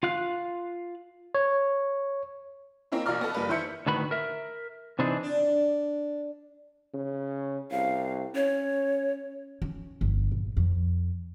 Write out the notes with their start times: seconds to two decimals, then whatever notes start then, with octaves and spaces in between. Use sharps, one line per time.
0.03 F4 F5 F#6
1.35 C#5
2.92 A#3 C4 C#4 D#4 E4
3.06 A#1 B2 F4 A#4 D5 F6
3.21 B3 A4
3.34 F#1 G3 A#3 B4
3.49 D#3 E3 C5 E5 G6 C#7
3.86 D2 A2 D#3 F#4 B4 B5
4.11 A#4 E5
4.99 C3 E3 C4 D4 D#4 G#4
5.23 D4
6.94 C#3
7.71 C2 F5
8.35 C#4 C#5
9.62 C#4
10.01 G1
10.32 A#1
10.57 F2